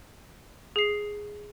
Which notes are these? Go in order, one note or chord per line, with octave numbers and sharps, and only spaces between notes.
G#4 C7